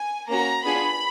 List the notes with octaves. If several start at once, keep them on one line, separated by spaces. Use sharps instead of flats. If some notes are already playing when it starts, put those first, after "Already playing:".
Already playing: G#5
A#3 C#4 F#4 A#5
B3 D4 F4 G#4 B5